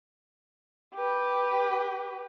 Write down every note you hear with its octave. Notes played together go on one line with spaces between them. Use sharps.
G4 B4